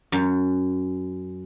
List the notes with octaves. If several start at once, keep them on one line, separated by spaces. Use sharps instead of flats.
F#2